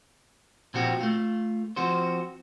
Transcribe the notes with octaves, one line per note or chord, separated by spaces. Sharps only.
A#2 F3 C4 F#4 G4
A3 F4
F3 C4 F#4 C5